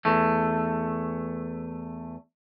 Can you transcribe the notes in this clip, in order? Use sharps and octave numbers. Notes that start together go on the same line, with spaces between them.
E2 A3